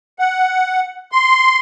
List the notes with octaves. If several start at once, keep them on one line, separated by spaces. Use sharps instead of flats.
F#5
C6